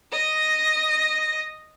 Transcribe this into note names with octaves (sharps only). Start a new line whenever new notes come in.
D#5 A#6